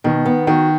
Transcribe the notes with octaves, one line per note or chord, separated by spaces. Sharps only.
B2 D#3
B3
D#3 F#4